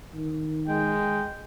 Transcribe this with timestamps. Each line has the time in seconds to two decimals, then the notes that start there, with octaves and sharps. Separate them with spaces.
0.14 D#3
0.68 G#3 G5